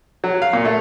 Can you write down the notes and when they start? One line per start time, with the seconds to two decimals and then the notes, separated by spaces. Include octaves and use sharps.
0.24 F#3
0.42 F5
0.53 A#2
0.65 A3